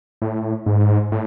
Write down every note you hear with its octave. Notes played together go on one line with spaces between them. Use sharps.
A2
G#2
A2